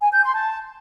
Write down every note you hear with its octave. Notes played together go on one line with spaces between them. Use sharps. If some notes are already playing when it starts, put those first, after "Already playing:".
G#5
G6
C6
A5